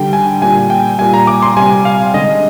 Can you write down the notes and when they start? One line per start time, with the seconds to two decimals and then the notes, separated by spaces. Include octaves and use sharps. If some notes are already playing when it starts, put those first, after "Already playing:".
Already playing: D3 G3 G5
0.13 G#5
0.42 A#2 G3 G#5
0.70 G5
0.99 A#2 G3 G#5
1.14 A#5
1.27 D6
1.43 C6
1.57 C3 G3 G#5
1.85 F5
2.14 D3 G#3 D#5